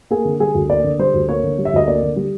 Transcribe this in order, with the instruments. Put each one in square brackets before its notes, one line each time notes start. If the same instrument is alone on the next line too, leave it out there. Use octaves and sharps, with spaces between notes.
[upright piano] A#3 G#4
D3
G3 G#4
D2
A#3 D5
D3
G3 C5
D2
A#3 C#5
D3
G3
E5
D2 D#5
A#3 D5
D3
G3